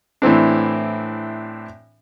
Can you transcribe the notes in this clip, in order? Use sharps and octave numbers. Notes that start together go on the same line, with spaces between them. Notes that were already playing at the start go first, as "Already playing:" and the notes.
A2 E3 C4 D4